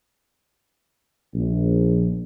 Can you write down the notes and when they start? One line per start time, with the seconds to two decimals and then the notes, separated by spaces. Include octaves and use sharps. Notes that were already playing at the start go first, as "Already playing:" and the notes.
1.34 A#1